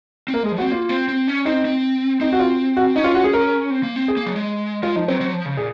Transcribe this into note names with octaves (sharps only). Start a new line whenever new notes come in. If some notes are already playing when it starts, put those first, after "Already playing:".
C4
A#3 A#4
G#3 G#4
F3
F#4
C4
A#3 F4
C4
C4
C#4
C4 D#4
C4
C4 D#4
F#4
F4
F#4
C#4 D#4
F4
F#4
G#4
A#4
C4
A#3
C4
G#4
A#3
F#3
G#3
G#3 F4
F3 D#4
F#3 C4
F#3
F3
C#3
A#2 G#4